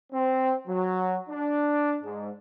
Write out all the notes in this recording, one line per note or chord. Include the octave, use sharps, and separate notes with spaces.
C4
F#3
D4
G#2